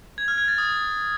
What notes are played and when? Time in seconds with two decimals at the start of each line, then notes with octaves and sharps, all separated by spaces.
0.18 G#6
0.28 F6
0.38 G#6
0.48 A6
0.58 D#6